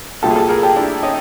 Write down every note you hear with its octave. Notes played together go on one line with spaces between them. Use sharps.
C2 A#2 F#3 G4 A4
G#4
G4 A4
G#4 A#4
G4 A4
D4 E4
C#4 D#4